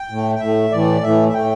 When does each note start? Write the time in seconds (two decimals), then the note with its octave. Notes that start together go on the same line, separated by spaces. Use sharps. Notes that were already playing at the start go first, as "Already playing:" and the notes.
Already playing: G5
0.10 A2 A3
0.35 G5
0.40 A2 A3 E5
0.72 A2 E3 A3 D5
1.03 A2 E3 A3 E5
1.28 E5
1.34 A2 A3 G5